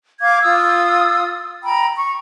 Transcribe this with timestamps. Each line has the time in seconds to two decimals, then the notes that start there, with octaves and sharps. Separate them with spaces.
0.21 F5 D6 G#6
0.42 F4 D#6 E6
1.64 G5 A#5 B5
1.96 C#6